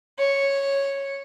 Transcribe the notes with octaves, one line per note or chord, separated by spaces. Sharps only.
C#5